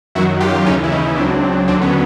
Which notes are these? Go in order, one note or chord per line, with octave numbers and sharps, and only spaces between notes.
F#2 D#3 F#3 E4 F#4
F4 G4
D#2 C#3 E3 C#4 D#4
E4
C#4 D#4
C#2 C#3 F#3 C4 D4
D#2 D3 F#3 C4 D4
B3 C#4